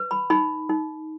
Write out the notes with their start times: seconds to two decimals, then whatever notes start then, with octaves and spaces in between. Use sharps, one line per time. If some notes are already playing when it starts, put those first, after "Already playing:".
Already playing: B4
0.11 B5
0.30 D#4 B5
0.69 D#4